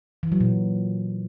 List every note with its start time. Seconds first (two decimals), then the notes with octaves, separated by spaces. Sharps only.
0.23 E3
0.32 F#3
0.40 A#2